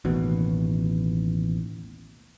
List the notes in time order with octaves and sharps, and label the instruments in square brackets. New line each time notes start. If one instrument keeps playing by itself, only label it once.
[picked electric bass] A1 D#2 B2